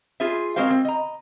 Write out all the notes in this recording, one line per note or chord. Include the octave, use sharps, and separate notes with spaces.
F4 G#4 C5 E5
G#3 C4 F#4 A#4 C5 F5
C4
D#5 A#5